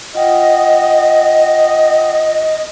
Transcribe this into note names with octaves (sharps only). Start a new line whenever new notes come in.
F4 D#5 F#5 G5